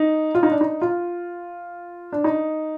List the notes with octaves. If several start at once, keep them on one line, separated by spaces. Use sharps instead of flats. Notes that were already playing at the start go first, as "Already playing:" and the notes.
Already playing: D#4
F4
D#4
D4
D#4
F4
D4
D#4